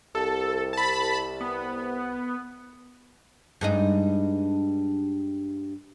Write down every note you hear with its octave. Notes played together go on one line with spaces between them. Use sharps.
C2 A4
A5 B5
B3
G2 G#3 D#4